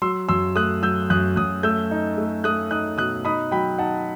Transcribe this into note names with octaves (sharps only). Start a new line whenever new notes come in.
F#3 C6 E6
F#2 C6 E6
A3 D#6 F#6
F#3 E6 G6
F#2 D#6 F#6
F#2 D#6 F#6
A3 E6 G6
D#4
A3
A3 D#6 F#6
D#4 D#6 F#6
B2 D#6 F#6
D#4 B5 D#6
F#3 G5 B5
D#4 F#5 A5